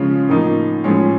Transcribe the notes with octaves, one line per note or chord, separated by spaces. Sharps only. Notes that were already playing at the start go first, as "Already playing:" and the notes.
Already playing: C#3 F3 G#3 C#4 F4
A2 F3 A#3 D#4
A2 F3 G#3 C#4